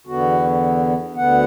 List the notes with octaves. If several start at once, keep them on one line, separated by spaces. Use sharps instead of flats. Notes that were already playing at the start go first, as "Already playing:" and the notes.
E2 D3 B3 F#4
D2 D3 B3 F#5